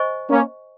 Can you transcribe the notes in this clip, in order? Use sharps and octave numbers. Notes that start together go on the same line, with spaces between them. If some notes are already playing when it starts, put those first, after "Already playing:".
Already playing: C5 D#5 G#5 C#6
A#3 C#4